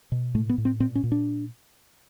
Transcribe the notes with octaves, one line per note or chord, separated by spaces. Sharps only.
B2
A2 A3
B3
A2
C4
A#2 C4
C#4
A#2
D4